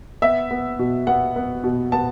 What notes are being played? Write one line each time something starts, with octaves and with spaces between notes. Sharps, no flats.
B3 E5
B3
B2
B3 F#5
B3
B2
B3 A5